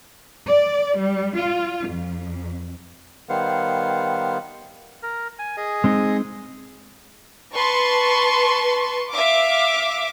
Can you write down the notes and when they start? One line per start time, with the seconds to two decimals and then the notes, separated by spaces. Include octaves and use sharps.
0.46 D5
0.97 G3
1.37 F4
1.86 F2
3.29 D#3 G3 B3 C5 F5 F#5
5.03 A#4
5.39 G#5
5.57 G#4 D#5
5.84 G#3 C4 D#4
7.54 B4 A5 C6 C#6
9.11 E5 F5 D6